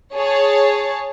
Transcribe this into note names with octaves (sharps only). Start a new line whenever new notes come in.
G#4 C#5 A5